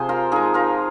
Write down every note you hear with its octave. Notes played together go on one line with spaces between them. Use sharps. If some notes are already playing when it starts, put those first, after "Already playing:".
Already playing: C3 F3 G#4 C5
F4 A#4
F3 G#3 D#4 G#4
F4 A#4